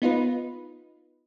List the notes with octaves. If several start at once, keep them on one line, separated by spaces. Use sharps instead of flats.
B3 D#4 F4 B4